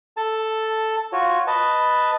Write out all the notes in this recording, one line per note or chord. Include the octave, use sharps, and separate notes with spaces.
A4 A5
F4 F#4 C#5
B4 D#5 A5